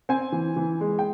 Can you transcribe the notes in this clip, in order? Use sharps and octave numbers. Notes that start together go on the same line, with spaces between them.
C4 G#5
E3
E3
G#3
G5